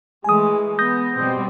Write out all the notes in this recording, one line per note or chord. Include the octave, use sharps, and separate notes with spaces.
E3 G#3 A3 G#5 D#6
B3 D#6 G6 A#6
B2 G3 C4